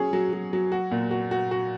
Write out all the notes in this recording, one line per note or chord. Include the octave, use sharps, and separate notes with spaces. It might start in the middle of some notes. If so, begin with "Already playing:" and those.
Already playing: F#3 C#4 G#4
F#3
F#3
F#3
F#4
A#2
F#4
F#4
F#4